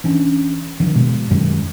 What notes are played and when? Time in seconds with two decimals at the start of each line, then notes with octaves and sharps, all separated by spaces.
0.04 E3 C#4 D4
0.80 D3 D#3 F3
0.95 B2 G#3
1.30 F#2 D#3 G#3